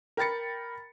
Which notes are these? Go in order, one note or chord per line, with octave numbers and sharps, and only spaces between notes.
A#4 G5 B5 A6 C#7